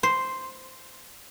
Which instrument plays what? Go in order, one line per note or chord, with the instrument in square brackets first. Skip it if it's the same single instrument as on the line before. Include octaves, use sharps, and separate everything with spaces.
[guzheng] C5